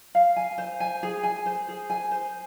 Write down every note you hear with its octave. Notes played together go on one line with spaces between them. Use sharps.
F5
G#5
C5
G#5
G#4
G#5
C5
G#4
G#5
C5